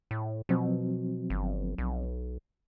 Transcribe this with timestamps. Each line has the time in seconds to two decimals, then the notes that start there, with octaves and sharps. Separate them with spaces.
0.11 A2
0.49 B2 F3 F#3 C4
1.30 G1
1.78 B1